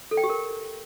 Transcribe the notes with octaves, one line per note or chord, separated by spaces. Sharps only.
A4
G5
G4
A#4